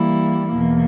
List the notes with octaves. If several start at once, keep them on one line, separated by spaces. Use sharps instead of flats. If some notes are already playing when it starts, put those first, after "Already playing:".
Already playing: E3 G3 A#3 E4
E2 B2 A#3